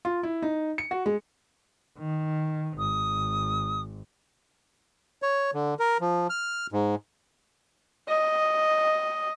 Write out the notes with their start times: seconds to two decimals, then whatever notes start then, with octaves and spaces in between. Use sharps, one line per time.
0.05 F4
0.23 E4
0.42 D#4
0.78 C#7
0.91 F#4
1.06 G#3
1.99 D#3
2.78 G#1 D#6
5.22 C#5
5.54 D3
5.79 A#4
6.01 F3
6.30 F6
6.72 G#2
8.09 D#5